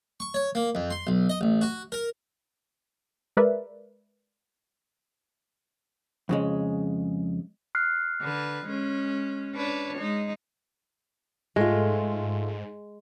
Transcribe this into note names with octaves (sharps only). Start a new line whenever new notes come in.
C#6
C#5
A#3
F2
C6
B1
D#5
A1
F#4
A#4
G#3 A#4 B4 D5 E5
F2 C#3 G#3
F6 F#6 C7
D3 B4
G#3 C#4
D4 B4 C#5
G#3 D#4
G#2 G#3 A3 F4